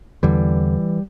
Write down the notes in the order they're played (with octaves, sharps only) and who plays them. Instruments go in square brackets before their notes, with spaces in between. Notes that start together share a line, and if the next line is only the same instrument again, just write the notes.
[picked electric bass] E2 D3 E3 G3